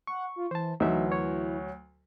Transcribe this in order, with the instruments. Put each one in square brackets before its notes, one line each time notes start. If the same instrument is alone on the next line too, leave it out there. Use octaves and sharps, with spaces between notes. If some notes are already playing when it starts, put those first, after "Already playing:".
[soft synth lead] F#5 [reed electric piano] C#6
[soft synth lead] F4
[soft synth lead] E3 [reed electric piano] C5 A5
[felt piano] D2 F#3 [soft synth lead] E3 [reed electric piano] D#4 E5
[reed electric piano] C#5